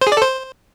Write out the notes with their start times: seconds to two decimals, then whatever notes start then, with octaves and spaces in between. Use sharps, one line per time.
0.01 C5
0.07 G#4
0.12 D5
0.17 A4
0.22 C5